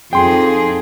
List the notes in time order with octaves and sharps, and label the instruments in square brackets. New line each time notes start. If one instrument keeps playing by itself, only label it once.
[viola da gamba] F2 D#4 [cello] G#4 [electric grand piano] G5 C6